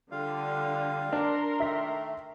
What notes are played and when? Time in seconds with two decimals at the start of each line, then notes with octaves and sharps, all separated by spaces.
0.11 D3 G3 F4 F5
1.13 D4 A#4 C6
1.60 D#3 A3 E5 B6